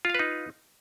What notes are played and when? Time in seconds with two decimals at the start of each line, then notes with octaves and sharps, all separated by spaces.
0.05 F4
0.10 F5
0.14 B4
0.19 D#4